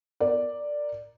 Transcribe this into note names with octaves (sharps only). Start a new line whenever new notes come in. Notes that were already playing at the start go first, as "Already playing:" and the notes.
A#4 D5